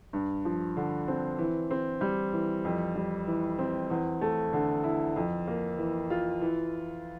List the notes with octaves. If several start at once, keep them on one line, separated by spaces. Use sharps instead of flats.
G2
F3
D3
C4
E3
C4
G3
E3
F2
G3
E3
C4
E2
A3
D3
E4
F2
A#3
E3
F4
E3